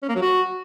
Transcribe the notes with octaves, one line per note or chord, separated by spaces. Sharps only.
C#4
A#3
F#3
F#4